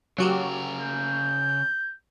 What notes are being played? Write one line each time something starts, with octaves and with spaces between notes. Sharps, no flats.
C#3 F#3 F#4 G4 A#4
G6